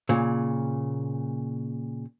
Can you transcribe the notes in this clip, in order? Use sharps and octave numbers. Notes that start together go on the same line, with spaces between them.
A#2 C#3